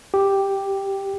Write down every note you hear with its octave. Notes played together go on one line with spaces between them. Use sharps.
G4